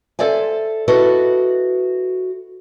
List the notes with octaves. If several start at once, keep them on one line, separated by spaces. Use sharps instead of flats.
A4 C5 D5 E5 G#5
E4 F#4 A4 B4 D#5